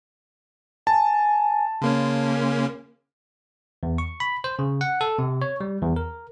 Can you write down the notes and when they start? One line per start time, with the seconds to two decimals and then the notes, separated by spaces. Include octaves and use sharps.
0.87 G#5 A5
1.81 C#3 A#3 C#4 C6
3.83 E2
3.98 C#6
4.20 B5
4.44 C5
4.59 C#3
4.81 F#5
5.01 A4
5.19 C3
5.42 C#5
5.61 G3
5.82 E2
5.96 A#4